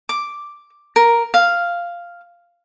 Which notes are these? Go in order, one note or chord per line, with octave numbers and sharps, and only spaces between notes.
D6
A#4
F5